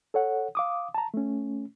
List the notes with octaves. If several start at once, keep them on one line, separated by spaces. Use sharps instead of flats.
A4 C#5 F#5
F5 D6 D#6
A5 A#5
A3 C#4